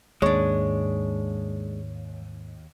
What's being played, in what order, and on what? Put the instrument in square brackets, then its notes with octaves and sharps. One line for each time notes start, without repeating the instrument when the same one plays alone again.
[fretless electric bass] D#2 [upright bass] G#2 [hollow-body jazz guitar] G#3 D4 [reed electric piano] C#5 C#6